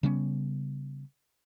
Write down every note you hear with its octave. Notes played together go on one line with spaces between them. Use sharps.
C#3 G3 B3 C#4